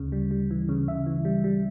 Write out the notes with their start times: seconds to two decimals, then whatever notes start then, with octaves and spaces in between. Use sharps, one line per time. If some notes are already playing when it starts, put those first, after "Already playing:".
Already playing: D2 C#3
0.12 G3
0.31 G3
0.51 E3
0.69 C#3
0.88 C#3 E5
1.06 E3
1.25 G3
1.44 G3